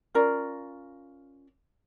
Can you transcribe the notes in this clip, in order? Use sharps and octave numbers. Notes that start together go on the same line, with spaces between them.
C#4 F4 A#4 D5